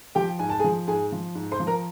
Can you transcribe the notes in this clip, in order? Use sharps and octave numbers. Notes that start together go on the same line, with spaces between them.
F3 G4 G5
G#2 G#5
A5
G#4 G#5
F3
G#2 G#4 G#5
F3
G#2
C5 C6
F3
A#4 A#5